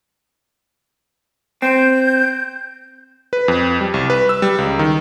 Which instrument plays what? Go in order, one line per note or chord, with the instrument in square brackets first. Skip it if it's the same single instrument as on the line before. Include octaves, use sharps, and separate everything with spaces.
[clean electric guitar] C4 [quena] G6
[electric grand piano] B4
F2
G3
C2
B4
E6
G3
C#2
D#3